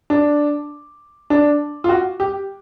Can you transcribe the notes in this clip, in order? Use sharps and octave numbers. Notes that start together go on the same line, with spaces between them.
D4
D4
F4
F#4
G4